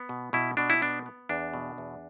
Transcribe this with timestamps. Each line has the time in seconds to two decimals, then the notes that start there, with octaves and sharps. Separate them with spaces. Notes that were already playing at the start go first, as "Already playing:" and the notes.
Already playing: B3
0.09 B2
0.33 B2 E4
0.57 B2 D4
0.70 E4
0.82 B3 D4
1.06 B3
1.29 E2 D4
1.54 B2
1.78 E2